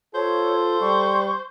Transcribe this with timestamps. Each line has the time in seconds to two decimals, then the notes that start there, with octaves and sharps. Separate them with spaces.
0.15 F4 A4 C5 C#5
0.81 G3 C#6